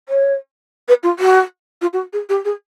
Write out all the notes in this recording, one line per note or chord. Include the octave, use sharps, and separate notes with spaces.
C#5
B4
F4
F#4
F4
F#4
G#4
G4
G#4